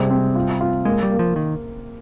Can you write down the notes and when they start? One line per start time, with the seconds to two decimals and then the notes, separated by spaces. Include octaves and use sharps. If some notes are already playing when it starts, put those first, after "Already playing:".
Already playing: C3 G3 G#3
0.10 C4
0.35 F4
0.61 F4
0.85 G#3 A#3
1.03 G3
1.11 A#3
1.19 F3
1.36 D#3